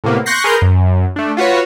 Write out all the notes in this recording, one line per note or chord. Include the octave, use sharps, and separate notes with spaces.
A2 C3 A#3 B3
C6 C#6 F#6 G6 A#6 C7
G#4 A#4 B4 A#5 C6 G6
F#2
A3 D4
F4 F#4 B4 C#5